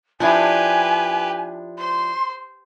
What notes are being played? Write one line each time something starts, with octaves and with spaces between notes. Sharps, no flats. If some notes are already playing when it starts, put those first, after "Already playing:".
F3 D4 E4 G4 B4 G#5
C5 C6